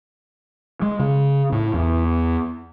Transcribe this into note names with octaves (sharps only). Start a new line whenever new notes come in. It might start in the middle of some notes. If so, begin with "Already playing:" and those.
G#3
C#3
A2
E2